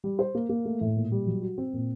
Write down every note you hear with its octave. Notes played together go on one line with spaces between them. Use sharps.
G3
C5
A#3
A#3
A3
A2
A#2
G3
F#3
F#4
C4
A#2